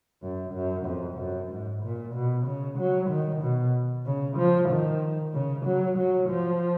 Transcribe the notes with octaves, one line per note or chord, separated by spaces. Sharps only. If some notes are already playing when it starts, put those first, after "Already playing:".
F#2
F#2
F2
F#2
G#2
A#2
B2
C#3
F#3
D#3
B2
C#3
F3
D#3
C#3
F#3
F#3
F3